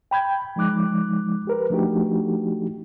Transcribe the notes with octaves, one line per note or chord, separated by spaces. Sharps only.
G5 B5 G6 G#6
F3 G#3 D#4 D6 F#6
G4 A#4 B4
F3 A3 D4 D#4 F#4 G4